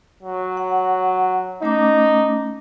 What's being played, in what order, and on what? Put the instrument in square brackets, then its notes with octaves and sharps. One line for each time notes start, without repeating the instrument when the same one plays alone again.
[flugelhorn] F#3
[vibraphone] F#5
[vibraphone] A3 C#4 D6 [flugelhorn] D#4